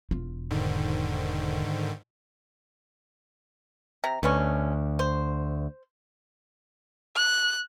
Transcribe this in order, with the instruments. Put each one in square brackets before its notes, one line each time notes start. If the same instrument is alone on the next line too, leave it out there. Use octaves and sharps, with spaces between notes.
[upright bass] E1 F4
[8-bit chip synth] G#2 D3 D#3
[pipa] C3 A#5
[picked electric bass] D2 [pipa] B2 B3 C#4
[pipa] C5
[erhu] F#6